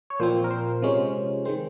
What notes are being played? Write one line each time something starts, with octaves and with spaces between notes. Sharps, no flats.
C#5
A#2 F3 C4 C5
A#4
C5
C3 F3 G#3 C#4
D#3 G#3 C4 C5